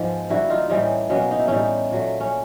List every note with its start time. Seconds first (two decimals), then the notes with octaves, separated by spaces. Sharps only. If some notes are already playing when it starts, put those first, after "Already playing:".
Already playing: G#2 F3 G#3 B3
0.29 D3 G3 A#3 E4 F#4
0.50 D#4 F4
0.69 A2 E3 G3 C#4 D#4
1.09 B2 F#3 A#3 B3 C#4
1.31 D#4
1.39 E4
1.48 A2 E3 G3 C#4 D#4
1.91 A#2 F#3 A3
2.20 C#4